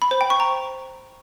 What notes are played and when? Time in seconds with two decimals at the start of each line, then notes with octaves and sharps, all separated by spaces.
0.02 B5
0.11 C5
0.21 G5
0.30 C#6
0.40 A#5